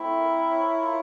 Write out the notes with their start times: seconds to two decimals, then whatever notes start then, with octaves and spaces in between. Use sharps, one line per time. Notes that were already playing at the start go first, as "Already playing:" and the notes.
Already playing: A3 C4 E4
0.19 A#4
0.51 C#5
0.82 F4